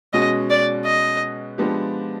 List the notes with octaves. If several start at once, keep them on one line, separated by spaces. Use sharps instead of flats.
B2 G#3 C#4 F#4 D#5
D5
D#5
F3 G#3 B3 D4 G4